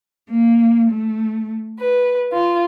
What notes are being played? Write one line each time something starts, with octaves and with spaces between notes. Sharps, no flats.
A#3
A3
B4
F4